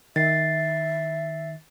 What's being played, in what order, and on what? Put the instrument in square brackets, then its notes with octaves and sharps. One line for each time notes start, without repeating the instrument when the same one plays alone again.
[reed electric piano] D#3 [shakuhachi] E5 [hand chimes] A6 C7